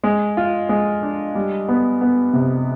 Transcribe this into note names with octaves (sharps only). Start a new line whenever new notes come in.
G#3
F4
G#3
D4
G3
B3
B3
C3